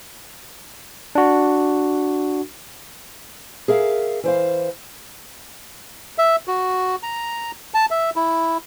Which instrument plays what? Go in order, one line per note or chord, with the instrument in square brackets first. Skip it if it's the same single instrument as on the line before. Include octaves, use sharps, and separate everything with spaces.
[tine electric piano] D4 F#4
[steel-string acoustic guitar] G#4 A#4 E5 F5
E3 C5 F5
[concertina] E5
F#4
A#5
A5
E5
E4